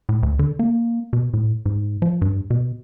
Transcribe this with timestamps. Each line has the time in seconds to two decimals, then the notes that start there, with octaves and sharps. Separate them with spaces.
0.09 A2
0.23 D2
0.39 D3
0.59 A#3
1.13 B2
1.34 A2
1.66 G#2
2.02 F3
2.22 G2
2.50 B2